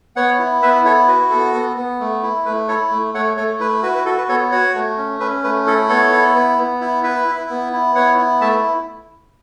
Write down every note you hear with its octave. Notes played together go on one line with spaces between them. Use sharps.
B3 C#5 F#5
E4
B3 B4 E5
E4 A4 C#5
F#4 B4
B3 A4
B3
B3
A3
E4
A3 B4
E4 A4 C#5
A3
A3 C#5 F#5
A3 A4 C#5
E4 B4
F#4 B4
B4
F#4 A4
B4
B3 A4 C#5
F#4 C#5 F#5
A3
C#4
C#4 B4 E5
A3 B4
E4 A4
B3 A4 C#5
E4
B3
B3
E4
E4 B4 E5
E4
B3
E4
B3 C#5 F#5
E4
A3 E5 A5